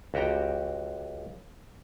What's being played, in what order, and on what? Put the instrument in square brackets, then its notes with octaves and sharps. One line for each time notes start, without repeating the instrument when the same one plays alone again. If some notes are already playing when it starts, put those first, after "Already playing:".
[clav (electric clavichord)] C#2 F#4 G4 G5 A#5